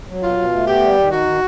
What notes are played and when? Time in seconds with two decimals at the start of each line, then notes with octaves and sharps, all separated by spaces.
0.09 F#3
0.23 B2 F4
0.38 B2
0.53 A3
0.68 B3 G4
0.82 G3
0.97 D#3
1.11 D#4 F#4
1.26 D#3